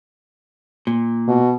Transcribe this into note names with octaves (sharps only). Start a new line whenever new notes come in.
A#2
B2